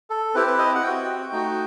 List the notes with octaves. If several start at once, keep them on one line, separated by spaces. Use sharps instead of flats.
A4
C4 E4 G4 B4
B4
D#5
F#5
C4 F#4 G5
A3 D#4 F#4